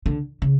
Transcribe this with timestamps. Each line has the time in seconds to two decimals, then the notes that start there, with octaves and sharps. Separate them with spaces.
0.06 D3
0.42 C#3